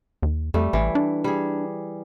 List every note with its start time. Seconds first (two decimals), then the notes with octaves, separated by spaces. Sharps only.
0.23 D#2
0.54 F2 G3 A3
0.73 A1 E3
0.95 D4
1.24 G3 G#4